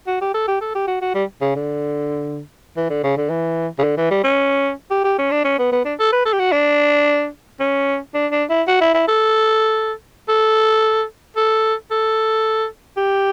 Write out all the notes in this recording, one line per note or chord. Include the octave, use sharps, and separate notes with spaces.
F#4
G4
A4
G4
A4
G4
F#4
F#4
G3
C#3
D3
E3
D3
C#3
D3
E3
C#3
D3
E3
G3
C#4
G4
G4
C#4
D4
C#4
B3
B3
D4
A4
B4
A4
G4
F#4
D4
C#4
D4
D4
E4
F#4
E4
E4
A4
A4
A4
A4
G4